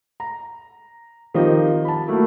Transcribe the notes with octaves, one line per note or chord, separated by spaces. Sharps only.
A#5
D#3 F3 C4 D#4 G4 D#5
A5 B5
F#3 A3 A#3 E4